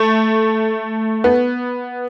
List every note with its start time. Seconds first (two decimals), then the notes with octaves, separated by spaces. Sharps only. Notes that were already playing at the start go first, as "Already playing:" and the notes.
Already playing: A3
1.24 B3